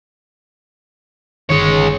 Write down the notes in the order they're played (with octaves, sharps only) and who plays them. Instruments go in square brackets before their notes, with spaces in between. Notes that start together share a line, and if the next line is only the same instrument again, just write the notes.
[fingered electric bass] G1 D#3 [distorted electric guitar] G#3 C#5